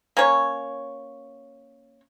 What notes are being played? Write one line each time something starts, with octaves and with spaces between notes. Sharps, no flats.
A#3 C#4 C#5